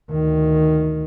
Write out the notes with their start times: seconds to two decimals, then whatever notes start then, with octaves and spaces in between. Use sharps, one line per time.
0.11 D2 D#3